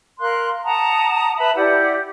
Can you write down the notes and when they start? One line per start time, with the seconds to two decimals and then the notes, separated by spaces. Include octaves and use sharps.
0.20 A#4 F5 C6 F#6
0.64 F#5 A5 A#5 D#6
1.38 B4 E5 A5 B5
1.56 E4 G4 D5 F#5